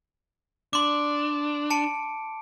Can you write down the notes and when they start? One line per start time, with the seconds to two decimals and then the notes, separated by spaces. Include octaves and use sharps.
0.73 D4 C6 D6
1.70 A5 C#7 D7